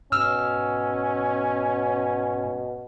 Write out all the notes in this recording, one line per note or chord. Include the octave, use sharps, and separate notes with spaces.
G#2 B2 C#4 E6 F6